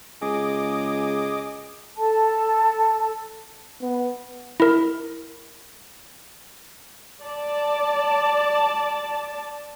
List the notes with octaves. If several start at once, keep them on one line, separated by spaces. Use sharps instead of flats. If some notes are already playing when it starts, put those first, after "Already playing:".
C#2 G#4 D#5 D6
A4 A5
B3
E4 A#4
D5 A5